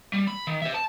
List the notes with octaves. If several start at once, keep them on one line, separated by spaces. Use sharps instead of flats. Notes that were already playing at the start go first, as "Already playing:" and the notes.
G3
B5
D#3
C5 E5
A5